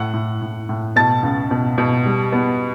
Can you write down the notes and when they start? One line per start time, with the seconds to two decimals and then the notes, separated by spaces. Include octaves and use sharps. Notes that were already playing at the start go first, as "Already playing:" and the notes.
Already playing: A2 F#5
0.14 A2
0.41 A2
0.69 A2
0.96 B2 A5 A6
1.23 C#2
1.51 B2
1.78 B2
2.06 G3
2.32 B3